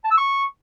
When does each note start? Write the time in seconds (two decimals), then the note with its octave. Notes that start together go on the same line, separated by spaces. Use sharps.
0.04 A5
0.11 E6
0.18 C#6